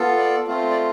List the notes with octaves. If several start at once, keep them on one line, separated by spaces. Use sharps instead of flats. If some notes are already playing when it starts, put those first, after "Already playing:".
Already playing: B3 F4 A4
D5
A3 C4 F4
D5